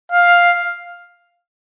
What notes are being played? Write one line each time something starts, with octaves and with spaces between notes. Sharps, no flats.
F5